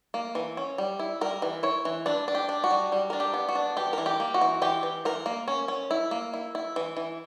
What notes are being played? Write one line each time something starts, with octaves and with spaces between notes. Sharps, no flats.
A#3
E3
C#4
G3
E4
G3 A#4
E3
E4 C#5
E3
D4 B4
D4
G4
D4
F#4
G3
G3
D4 A#4
G4
B3
F#4
D4
E3 G4
E3 A#4
G4
A#3
F#4
E3
E3 G4
E3
E3 A#4
A#3
C#4
C#4
E4
A#3
E4
E4
E3
E3